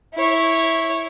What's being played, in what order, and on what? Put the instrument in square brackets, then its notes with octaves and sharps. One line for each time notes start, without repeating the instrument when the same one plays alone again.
[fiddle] E4 C#5